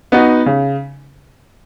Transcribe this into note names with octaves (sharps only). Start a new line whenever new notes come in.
B3 D#4 F#4
C#3